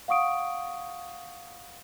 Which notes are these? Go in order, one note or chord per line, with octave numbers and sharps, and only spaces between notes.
F5 F#5 C#6 D#6 D7